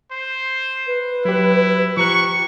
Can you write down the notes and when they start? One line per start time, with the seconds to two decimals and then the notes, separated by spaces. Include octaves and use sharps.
0.11 C5
0.87 B4
1.25 F#3 E4 G4
1.97 F3 G4 A#5 C#6 F#6